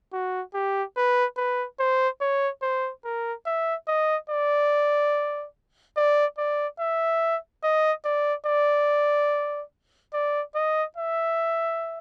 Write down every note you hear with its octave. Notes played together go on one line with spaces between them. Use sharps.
F#4
G4
B4
B4
C5
C#5
C5
A#4
E5
D#5
D5
D5
D5
E5
D#5
D5
D5
D5
D#5
E5